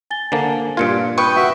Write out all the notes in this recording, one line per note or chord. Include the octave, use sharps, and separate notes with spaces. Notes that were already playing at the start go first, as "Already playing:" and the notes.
G#5 A6 G7
D3 A#3 C5 G#5 A5
G2 A#2 F4 G#6 C#7 D7
B4 G5 C#6 D#6
F#4 E5